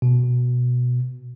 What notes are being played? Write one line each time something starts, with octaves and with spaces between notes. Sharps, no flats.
B2